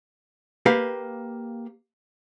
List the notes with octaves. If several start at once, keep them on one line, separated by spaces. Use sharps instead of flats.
A#3 G4 B4 F5